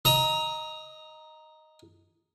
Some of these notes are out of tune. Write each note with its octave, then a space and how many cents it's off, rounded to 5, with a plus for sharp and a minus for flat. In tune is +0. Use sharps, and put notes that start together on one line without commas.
D#5 +0 A#5 +0 D#6 +45